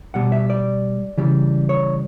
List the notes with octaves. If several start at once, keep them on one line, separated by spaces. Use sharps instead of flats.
B2 G3 F#5
E5
D5
C#3 E3 G3
C#5